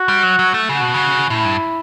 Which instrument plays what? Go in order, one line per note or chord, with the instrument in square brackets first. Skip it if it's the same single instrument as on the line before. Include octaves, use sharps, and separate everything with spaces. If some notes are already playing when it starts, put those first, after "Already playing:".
Already playing: [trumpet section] F#4
[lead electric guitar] G3
F#3
F#3
A3
[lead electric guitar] C#3 [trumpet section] F#4
[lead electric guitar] B2
C#3
[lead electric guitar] A2 [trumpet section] E4
[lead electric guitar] G2